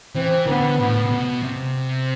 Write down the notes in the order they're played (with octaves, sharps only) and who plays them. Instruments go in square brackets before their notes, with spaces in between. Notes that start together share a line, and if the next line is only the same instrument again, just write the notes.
[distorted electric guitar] E3 [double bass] C4
[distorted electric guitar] D3 [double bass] B3
[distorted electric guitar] A2
C3
B2
C3